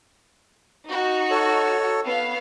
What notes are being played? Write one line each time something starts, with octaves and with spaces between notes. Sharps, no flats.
D#4 F#4
A4 C#5
B3 F5